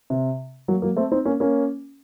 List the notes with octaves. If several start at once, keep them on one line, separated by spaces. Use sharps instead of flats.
C3
F#3 A#3
F#3 A#3
A3 C4
C4 D#4
A#3 C#4
A#3 C#4